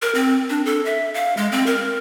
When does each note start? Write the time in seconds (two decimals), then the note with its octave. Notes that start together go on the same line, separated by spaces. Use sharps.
0.02 A#4
0.15 C4
0.50 D4
0.66 A4
0.85 E5
1.14 F5
1.37 G#3
1.52 C4
1.66 A#4